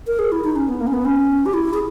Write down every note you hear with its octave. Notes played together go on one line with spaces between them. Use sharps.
A#4
G#4
E4
D#4
C#4
B3
A#3
C#4
B3
C#4
G4
E4
G#4